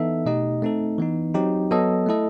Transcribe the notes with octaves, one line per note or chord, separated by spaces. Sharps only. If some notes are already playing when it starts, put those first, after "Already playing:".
Already playing: E3 B3 D#4 A4 E5
B2 A3 D#4 G4 D#5
A3 C4 D#4 A4
E3 B3 D#4
F#3 C4 D#4 G4
F#3 B3 F#4 A4 D#5
A3 E4 A4 D#5